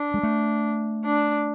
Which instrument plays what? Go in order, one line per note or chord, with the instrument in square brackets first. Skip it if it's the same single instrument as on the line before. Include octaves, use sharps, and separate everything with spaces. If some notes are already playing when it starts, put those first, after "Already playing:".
Already playing: [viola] D4
[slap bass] G#3
A3
[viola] D4